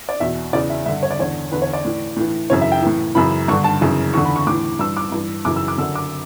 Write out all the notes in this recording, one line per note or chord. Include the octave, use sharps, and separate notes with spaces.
D5
E2 B2 E5
E2 C#3 E3 D5
E5
G2 D3 E5
C#5
D5
E2 D3 C#5
E2 D3 B4
C#5
D5
A2 E3
A2 E3
F#2 C#3 E3 C#5
E5
G5
A2 E3
F#2 C#3 E3 B5
G2 D3 C#6
A5
F#2 C#3 E3
E2 D3 C#6
B5
C#6
A2 E3 D6
G2 E3 E6
D6
G2 E3
F#2 C#3 E3 D6
E6
D6
F#2 D3 E6
D6